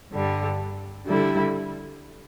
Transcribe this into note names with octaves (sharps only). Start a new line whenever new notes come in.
G2 D3 G3
D3 G3 E4 A4